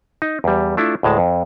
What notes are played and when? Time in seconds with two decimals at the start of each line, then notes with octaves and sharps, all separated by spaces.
0.22 D#4
0.44 E2 G3
0.77 A3 D4 E4 F4
1.03 D2 A2 G#3 A5
1.18 F2